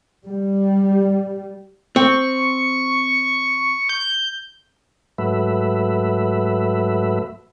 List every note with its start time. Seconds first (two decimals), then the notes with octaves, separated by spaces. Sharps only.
0.25 G3
1.96 C4 C#6
3.89 G6
5.18 G#2 F#3 A3 B4 E5